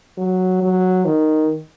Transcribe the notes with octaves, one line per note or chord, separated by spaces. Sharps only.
F#3
F#3
D#3